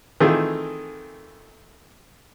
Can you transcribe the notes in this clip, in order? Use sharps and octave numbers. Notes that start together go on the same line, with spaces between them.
D#3 E3 A3 C4 F4 G#4